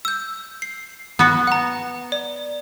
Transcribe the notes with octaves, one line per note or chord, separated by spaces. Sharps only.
E6 G6
C7
B3 F#4
F#5 A#5
D5